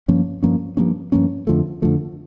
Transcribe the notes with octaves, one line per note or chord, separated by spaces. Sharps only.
G2 F3 A#3 C#4
G2 F3 A#3 C#4
G2 F3 A#3 C#4
G2 F3 A#3 C#4
F2 D3 F3 A3
F2 D3 F3 A3